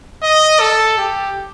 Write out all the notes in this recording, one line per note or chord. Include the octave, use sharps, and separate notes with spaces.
D#5
A4
G4